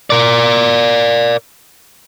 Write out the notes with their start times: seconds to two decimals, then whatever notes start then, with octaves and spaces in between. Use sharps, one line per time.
0.10 A#4 D5